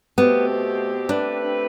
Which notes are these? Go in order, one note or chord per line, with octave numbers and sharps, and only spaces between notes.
B2 A3 B3 C4 G4
A3 C4 D4 G4 B4